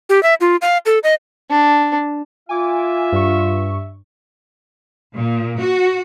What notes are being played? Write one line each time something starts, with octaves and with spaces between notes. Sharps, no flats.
G4
E5
F4
F5
A4
D#5
D4
F4 E5 G#5 D6
G2 C#6
A#2
F#4